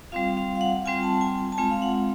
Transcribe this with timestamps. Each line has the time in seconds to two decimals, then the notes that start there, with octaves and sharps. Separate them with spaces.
0.12 G3 C4 F4 F5
0.37 F5
0.55 F5
0.61 F#5
0.86 G3 C4 F4 G#5
1.03 A5
1.21 G#5
1.52 A5
1.57 G#3 C4 F4 G#5
1.71 F5
1.82 F#5